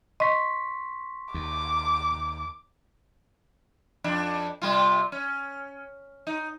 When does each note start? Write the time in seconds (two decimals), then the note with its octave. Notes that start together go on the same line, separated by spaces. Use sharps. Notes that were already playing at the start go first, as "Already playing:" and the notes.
0.20 D#5 C6 C#6 B6
1.34 D#2 D6
4.04 F2 D4
4.62 C3 G3 F4
5.12 C#4
6.27 D#4